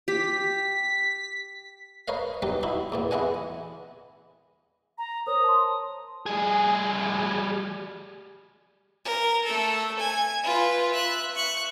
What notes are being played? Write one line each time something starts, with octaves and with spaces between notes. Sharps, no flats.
G4 B6
A#4 B4 C#5 D#5 F5
F#3 B3 D#4 G4 B4
D#4 E4 F#4
E2 A#2 B3
E2 B3 E4 D#5 F#5 G#5
A#5
A#4 C5 C#5 D#6
A5 C6
G3 G#4
A#4
A3 A4
G#5
F4 B4
E5 F#6
C#6 F#6